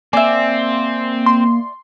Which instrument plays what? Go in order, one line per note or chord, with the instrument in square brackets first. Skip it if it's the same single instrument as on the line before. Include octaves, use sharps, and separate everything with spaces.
[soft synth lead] A#3 [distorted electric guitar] C4 [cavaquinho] D5 E5 [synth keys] G#5
[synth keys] C6